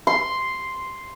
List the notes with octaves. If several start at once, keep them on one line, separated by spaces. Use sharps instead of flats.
C6